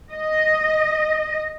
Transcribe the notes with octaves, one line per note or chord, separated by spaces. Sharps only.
D#5